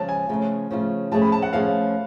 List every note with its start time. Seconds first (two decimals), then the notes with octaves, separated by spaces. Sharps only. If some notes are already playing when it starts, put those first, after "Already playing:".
Already playing: C#3 F3 G#3 A5
0.09 G#5
0.29 C#3 F3 A3 F4
0.71 C#3 F3 A3 F4
1.12 F3 A3 C#4 G#4 A5
1.22 B5
1.32 A5
1.42 F#5
1.53 F3 A3 C#4 G#4 F5